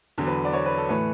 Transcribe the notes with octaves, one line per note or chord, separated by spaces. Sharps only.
E2 D3 F#3
B4
D5
C#5
B4
A4
A2 E3 A3 B4